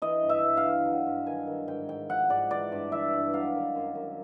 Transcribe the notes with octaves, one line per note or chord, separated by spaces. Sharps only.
E3 D#5
G2
E5
G2
F5
E3
F#3
G2
D#3 G#5
D#3
G#2 G5
G#2 G5
F3 F#5
G#2 D5
E3 D5
G2
E3 E5
G2
F#3 F5
D#3
F#2
F#2